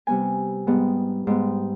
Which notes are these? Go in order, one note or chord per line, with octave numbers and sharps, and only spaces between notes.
C3 G3 B3 G#5
G#2 G3 B3
G#2 G3 B3